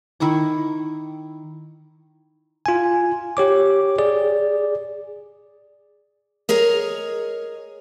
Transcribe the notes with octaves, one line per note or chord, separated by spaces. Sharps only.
D#3 E4 C#6 D6
F4 G#5
G4 C#5 D6
G#4 D5
G#4 A#4 C#5 D#5 A#5